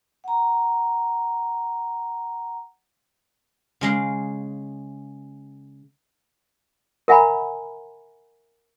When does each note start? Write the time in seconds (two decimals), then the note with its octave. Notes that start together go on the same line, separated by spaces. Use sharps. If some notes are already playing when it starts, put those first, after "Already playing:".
0.24 F#5 A#5
3.81 C#3 G#3 F5
7.08 A#4 E5 F#5 G#5 A#5 B5